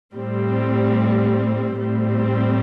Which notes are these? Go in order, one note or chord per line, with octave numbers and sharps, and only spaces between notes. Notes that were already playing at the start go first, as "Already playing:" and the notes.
A2 G3 C4
A2 G3 C4